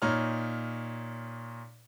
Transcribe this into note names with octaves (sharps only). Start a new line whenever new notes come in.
A#2 D#4 C#5 A#5 F6